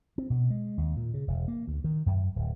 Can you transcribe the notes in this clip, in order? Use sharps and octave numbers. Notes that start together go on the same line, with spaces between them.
C4
B2
G#3
D#2
A#2
C#3
E1
A#3
D2
D#3
F#2
D1